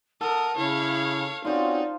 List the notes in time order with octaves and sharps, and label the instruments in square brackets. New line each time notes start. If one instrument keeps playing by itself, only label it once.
[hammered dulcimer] A4 [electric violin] A#4 D#6 [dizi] F#5
[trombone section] C#3 [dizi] E4 [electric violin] C#5 F5
[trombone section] C4 C#4 F#4 [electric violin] D#4 [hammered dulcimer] F4 C5 F5 [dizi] D5